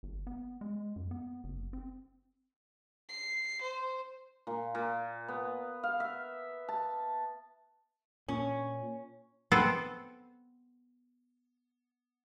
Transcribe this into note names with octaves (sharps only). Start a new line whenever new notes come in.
G1
B3
G#3
F#2
B3
F#1
C4
C7
C5
A#2
A#2
B3
F5
E5
A5
A#2 C#4
B3 C4 A4